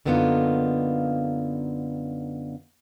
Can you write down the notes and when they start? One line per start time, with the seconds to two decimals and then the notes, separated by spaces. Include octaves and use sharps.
0.05 F#2 D3 A#3 B3 D#4 F4